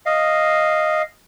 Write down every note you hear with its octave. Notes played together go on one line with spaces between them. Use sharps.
D#5 F5